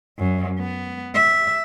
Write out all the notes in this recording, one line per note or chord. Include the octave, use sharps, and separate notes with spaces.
F#2
B3
E5